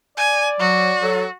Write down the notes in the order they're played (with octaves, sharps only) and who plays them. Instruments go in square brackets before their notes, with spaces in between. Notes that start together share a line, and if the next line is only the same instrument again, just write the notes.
[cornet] D5 [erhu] G#5
[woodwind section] F#3 [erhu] F#4
[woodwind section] F#3 A4